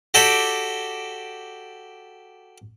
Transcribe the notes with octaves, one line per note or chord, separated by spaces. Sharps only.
F#4 G4 A4 D5 G5 B5